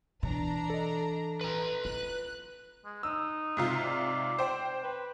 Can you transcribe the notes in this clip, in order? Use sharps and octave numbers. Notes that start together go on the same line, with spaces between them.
B2 E3 D4 A#5
A4 D#5
B4 A#5
F4 F#6
G#3
D#4 E6
G#2 C3 F4
D5
C5 G5
B4